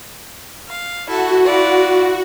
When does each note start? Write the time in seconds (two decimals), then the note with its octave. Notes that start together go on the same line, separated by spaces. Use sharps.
0.66 F5
1.07 E4 F#4 A4
1.44 E4 F4 D5